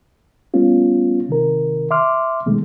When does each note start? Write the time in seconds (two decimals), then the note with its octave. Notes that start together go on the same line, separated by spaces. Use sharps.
0.54 G3 A3 B3 C#4 F4
1.29 C3 D#3 A#4
1.91 E5 C6 D6 F6
2.46 B2 D#3 G#3 A3